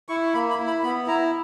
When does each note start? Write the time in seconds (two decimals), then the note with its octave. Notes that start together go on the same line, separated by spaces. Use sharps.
0.09 E4 C#6
0.34 A#3 B5
0.50 B5
0.58 E4
0.67 B5
0.83 B3 B5
1.06 E4 A#5